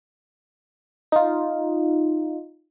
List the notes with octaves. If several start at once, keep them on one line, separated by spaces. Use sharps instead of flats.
D#4 F4